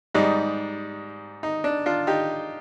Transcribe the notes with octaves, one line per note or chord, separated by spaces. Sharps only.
G#2 G3 D#4
D#4
D4
D4 F4
D#4 G4